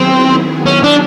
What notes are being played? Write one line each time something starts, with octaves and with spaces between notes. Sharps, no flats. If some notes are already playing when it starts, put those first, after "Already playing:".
Already playing: D#3 F#3 B3 C4 E4 G#4
C#4
D4